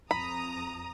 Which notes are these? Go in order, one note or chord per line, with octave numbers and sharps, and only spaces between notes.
F2 A#5 B5 D#6